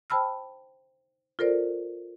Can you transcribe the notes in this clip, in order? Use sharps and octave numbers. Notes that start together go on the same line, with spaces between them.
C5 G5 A5 B5 E6 F6
F4 A4 A#4 C5 D5